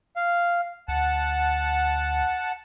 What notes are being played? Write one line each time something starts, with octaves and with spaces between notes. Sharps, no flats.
F5
D2 F#5 A5